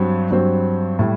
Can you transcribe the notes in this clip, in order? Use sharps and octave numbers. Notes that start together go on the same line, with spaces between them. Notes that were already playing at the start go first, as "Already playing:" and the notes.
Already playing: G2 F#3 C4
G2 F#3 C4
A2 G3